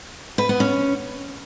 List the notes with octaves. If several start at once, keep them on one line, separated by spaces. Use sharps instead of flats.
B4
B3
C#4